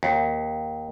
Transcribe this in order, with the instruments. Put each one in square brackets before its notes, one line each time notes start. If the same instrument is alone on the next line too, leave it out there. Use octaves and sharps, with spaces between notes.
[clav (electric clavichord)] D#2